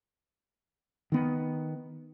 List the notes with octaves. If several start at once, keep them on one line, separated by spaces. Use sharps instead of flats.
D#3 B3